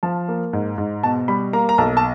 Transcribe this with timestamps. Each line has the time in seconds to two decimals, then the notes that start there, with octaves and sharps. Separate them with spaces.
0.03 F3 A5
0.28 A#3
0.53 G#2
0.78 G#2
1.03 B2 A5
1.28 G3 B5
1.53 A#3 A#5
1.69 A#5
1.78 B1 A5
1.97 A5